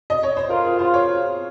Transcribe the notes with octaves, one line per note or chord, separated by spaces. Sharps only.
D#5
C#5
C5
F4 A#4
G#4
F4 C5
C#5